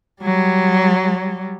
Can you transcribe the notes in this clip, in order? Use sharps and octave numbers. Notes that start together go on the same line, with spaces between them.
F#3 G3